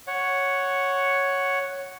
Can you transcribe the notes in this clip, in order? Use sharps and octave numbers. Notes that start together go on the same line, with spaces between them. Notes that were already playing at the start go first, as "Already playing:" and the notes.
C#5 F#5